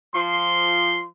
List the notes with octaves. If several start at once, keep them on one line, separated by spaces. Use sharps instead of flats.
F3 C6